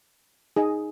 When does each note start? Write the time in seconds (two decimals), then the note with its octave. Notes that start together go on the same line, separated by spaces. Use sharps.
0.56 D#4 G#4 D#5